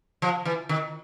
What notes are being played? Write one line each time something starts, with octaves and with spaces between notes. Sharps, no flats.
F3
E3
D#3